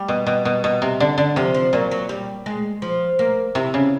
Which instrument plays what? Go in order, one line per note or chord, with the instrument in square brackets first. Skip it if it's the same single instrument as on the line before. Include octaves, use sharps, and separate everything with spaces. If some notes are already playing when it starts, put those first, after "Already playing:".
Already playing: [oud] G3
[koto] B2
B2
B2
B2
C3
D3
D3
[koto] C3 [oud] F3
[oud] F3
[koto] A#2 [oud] F#3
[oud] F#3
G3
G#3
F3
A#3
[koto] C3 [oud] E4
[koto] C#3